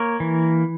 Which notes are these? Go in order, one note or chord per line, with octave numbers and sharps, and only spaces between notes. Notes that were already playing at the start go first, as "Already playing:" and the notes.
Already playing: A#3 A#4 C#5
E3